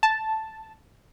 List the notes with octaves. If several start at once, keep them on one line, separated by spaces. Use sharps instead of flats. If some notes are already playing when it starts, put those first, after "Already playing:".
A5